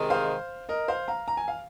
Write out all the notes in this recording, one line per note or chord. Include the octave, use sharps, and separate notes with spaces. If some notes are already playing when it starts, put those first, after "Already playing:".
Already playing: C3 D#3 G#3
C5 F5
A#4 D#5
C5 F5
F5 A#5
A#5
G#5
F5